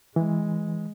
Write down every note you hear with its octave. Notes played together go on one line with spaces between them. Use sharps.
E3 G#3